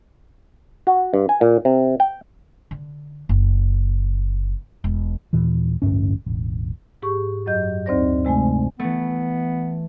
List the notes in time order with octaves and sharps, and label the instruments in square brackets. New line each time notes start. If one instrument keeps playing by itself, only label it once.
[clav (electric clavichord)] F#4
G2
G#5
A#2
C3
G5
[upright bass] D3
F#1
E1
[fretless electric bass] D#2 A#2 E3
A1 D2 G2 C#4
E1 A1
[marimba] G#2 G4 G#4 C#6
F#2 F#3 D#5 G6
D2 C4 D#4 C5 D5 A#6
C3 G#3 A3 G#5
[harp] E3 A3 [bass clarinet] B3